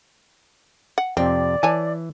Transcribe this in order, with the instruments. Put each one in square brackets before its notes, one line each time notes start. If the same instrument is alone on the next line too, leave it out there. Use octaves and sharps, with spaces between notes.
[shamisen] F#5
[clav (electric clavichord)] F2 C3 [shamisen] C4 [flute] D5
[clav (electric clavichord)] E3 [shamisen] C#5 G#5 A5